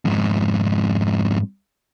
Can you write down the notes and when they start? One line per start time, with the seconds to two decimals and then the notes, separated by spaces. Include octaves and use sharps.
0.05 F2 G#2